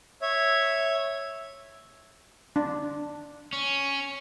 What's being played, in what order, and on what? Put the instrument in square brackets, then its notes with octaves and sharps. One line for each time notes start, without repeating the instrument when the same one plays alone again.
[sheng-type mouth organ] C#5 E5
[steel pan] D4
[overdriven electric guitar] C#4